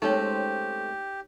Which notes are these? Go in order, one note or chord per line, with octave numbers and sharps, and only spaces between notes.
G#3 A3 C4 C#4 D#4 G4 C#5